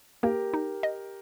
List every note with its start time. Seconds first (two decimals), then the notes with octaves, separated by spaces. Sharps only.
0.23 A#3 G4 A#4
0.54 D#4
0.83 D#5